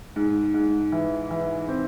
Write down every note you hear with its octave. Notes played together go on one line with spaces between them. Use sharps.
G#2
G#2
E3
E3
C4